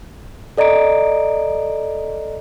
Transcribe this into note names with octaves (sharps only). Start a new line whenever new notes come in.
A4 D5 D#5 A#5 D7